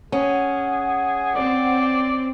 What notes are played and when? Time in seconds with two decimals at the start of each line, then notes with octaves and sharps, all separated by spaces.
0.12 C#4 G#4 F#5
1.36 C4 D5